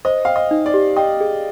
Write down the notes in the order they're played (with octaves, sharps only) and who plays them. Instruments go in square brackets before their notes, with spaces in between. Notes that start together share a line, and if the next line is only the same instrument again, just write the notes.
[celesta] C5 [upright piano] D#5
[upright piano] F5 [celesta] G5
[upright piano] D#5
[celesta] D#4
[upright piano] D5
[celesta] G4
[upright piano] D#5 [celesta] G5
[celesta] G#4